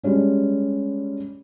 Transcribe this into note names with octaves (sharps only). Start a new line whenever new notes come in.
G3 G#3 C#4 D4